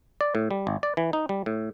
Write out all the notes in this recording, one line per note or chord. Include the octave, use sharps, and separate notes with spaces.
D5
A2
G3
G#1
D5
E3
D#4
G3
A2